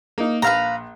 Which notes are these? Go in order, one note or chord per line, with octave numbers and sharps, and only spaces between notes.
A#3 D#4
A#1 B4 F5 A#5